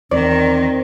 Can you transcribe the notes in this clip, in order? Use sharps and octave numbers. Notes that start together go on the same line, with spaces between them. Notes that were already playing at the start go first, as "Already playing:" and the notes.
E2 D#3 C4 D5